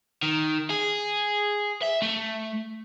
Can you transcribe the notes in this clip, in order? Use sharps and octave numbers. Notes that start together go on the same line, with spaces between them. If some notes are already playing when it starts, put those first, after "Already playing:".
D#3
G#4
E5
A3